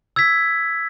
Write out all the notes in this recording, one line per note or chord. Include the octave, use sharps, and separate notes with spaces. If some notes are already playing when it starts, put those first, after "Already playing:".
E6 G#6 B6